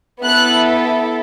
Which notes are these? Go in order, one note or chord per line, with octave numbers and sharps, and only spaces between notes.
B3 E4 A4 F#6